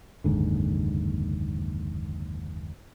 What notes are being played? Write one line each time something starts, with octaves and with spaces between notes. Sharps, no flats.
F#1 D#2 G#2 D3